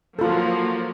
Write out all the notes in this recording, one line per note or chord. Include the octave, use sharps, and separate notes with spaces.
F3 F#3 A#3 F4 A4